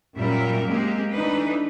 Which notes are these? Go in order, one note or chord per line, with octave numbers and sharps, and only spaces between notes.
F#2 A#2 G3 C#4 A#4 E5
G#3 A#3 C4 G4
E3 A3 D4 D#4 B4